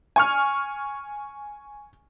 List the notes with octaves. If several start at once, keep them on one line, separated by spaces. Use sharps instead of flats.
G#5 C#6 F6